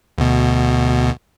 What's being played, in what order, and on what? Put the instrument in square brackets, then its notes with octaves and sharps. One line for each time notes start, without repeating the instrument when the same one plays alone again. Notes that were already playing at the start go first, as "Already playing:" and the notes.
[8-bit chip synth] D2 B2